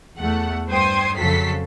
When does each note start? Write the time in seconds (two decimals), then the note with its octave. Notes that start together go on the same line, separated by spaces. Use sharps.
0.18 E2 A3 F#5
0.69 G2 C5 G5 C6 D#6 G#6
1.16 F2 C#3 F#3 A4 B6 C7